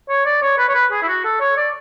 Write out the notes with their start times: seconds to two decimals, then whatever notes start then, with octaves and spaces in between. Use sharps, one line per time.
0.09 C#5
0.26 D5
0.42 C#5
0.58 B4
0.69 C#5
0.75 B4
0.92 G#4
1.02 E4
1.08 F#4
1.24 A4
1.40 C#5
1.57 D5